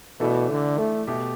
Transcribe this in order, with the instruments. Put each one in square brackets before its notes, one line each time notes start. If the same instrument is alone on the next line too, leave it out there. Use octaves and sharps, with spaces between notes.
[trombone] B2 [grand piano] E3 A3 D4 A4
[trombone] D3
A3
[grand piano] B2 A3 G4